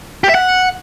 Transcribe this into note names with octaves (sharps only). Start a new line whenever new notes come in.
G4
E5
F#5